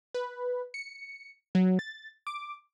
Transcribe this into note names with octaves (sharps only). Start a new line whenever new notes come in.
B4
C#7
F#3
A6
D6